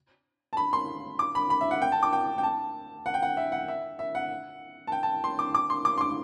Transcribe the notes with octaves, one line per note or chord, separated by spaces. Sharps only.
A5
B5
C6
D6
B5
B5
E5
F#5
G5
A5
D6
G5
G5
A5
F#5
G5
F#5
E5
F#5
E5
E5
F#5
A5
G5
A5
C6
D6
D6
C6
D6
C6
D6